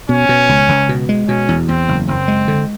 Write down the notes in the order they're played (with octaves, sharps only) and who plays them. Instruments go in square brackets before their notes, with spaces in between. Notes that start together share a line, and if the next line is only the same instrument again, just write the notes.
[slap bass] B2 [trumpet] C#4
[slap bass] B2
C#2
C#2
B2
G#3
[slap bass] B2 [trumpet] C#4
[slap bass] E2
[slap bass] E2 [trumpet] C4
[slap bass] F#1
[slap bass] F#1 [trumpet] C4
[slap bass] G#3
D3